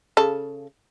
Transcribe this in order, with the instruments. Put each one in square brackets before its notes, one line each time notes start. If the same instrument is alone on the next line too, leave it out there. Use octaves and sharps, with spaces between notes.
[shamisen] C#3 A4